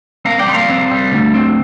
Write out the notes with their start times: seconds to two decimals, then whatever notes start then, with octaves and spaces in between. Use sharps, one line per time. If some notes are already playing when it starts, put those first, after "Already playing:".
0.25 C4 F5 A#5
0.39 D5 G5
0.47 G3 C6
0.54 F5 A#5
0.69 C4
0.91 G3
1.12 D2
1.34 C4